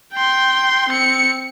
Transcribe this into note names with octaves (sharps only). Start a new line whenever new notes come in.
G5 C6
C4 C#7